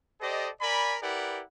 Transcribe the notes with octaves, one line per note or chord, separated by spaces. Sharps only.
G4 A4 C5 D5 D#5
A#4 D5 G#5 B5
E4 G4 A#4 B4 D5 F#5